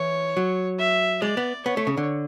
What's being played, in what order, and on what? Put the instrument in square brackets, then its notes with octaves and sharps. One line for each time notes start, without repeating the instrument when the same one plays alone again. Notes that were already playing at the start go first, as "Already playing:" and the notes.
Already playing: [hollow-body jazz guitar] E3 [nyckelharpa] C#5
[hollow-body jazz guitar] F#3
[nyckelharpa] E5
[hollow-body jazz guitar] G#3 [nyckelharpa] D5
[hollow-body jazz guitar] B3
[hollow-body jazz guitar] B3 [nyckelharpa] C#5
[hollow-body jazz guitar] A3
C#3
D3